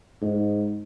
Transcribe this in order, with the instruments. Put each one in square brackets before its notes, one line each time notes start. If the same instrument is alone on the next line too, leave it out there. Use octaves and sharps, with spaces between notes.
[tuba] G#2